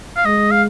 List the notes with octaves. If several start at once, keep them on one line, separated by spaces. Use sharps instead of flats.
F5
G#3 D#5
F5